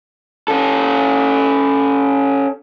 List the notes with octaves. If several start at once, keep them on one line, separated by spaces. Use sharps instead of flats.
C#4 A4